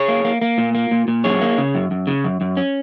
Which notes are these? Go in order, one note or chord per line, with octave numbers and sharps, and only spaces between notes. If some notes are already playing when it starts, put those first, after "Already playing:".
Already playing: G#4 C#5
A#3
A#3
A#3
A#2
A#3
A#2
A#2
F#2 G#4 C#5
A#3
C#3
F#2
F#2
C#3
F#2
F#2
C#4